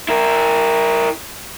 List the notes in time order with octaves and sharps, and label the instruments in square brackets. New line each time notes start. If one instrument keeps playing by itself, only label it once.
[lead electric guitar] E4 A#4